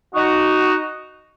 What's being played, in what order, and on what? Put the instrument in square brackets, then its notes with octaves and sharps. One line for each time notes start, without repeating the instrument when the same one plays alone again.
[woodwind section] D#4 F#4